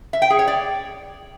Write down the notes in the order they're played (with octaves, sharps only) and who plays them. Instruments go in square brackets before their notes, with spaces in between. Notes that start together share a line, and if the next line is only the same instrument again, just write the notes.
[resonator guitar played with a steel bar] E5
G5
G#4
C#5
D5